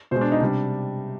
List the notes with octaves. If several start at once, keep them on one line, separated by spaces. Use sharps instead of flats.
B2 G#3 C5
D4
D#4
C3 G3 D4